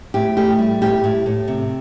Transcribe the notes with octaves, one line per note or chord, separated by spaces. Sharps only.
A2 G4
A3 G4
G3
A2 G4
A2
A2
C3